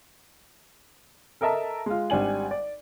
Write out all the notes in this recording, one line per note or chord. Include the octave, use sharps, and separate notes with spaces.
A4 A#4 D#5 E5 A5 A#5
G#3 F4
G#1 G3 D4 G#5 F#7
D5